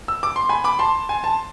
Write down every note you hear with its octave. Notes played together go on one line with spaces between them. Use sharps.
E6
D6
C6
G#5 B5
B5 D6
A5 C6
G#5
A5